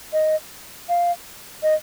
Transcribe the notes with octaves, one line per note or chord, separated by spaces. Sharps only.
D#5
F5
D#5